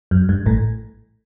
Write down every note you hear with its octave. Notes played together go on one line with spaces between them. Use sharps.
F#2
G2
A1 A2